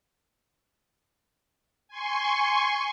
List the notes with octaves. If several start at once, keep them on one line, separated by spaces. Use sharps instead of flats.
G#5 C6 C#6